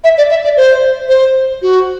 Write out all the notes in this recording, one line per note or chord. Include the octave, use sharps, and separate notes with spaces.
E5
D5
E5
D5
C5
C5
F#4